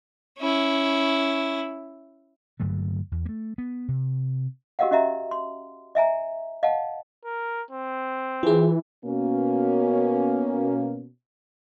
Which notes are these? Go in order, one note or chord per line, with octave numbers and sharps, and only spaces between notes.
C#4 E4
G2 D3 F#3 A3
E2
A3 A#3
B3
C3
F#4 G4 A#4 D#5 F5 F#5
C#4 F#4 D#5 E5 A#5
C6
D#5 E5 G#5 A#5
D#5 F5 F#5 A5
A#4
C4
E3 F4 G#4
B2 A#3 C#4